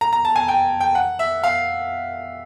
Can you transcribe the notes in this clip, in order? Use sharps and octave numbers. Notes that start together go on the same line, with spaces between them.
A#5
A#5
A5
G#5
G5
G5
F#5
E5
F5